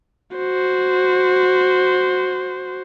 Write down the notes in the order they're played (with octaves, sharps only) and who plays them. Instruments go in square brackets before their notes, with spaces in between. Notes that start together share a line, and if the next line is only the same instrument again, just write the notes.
[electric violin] F#4 C5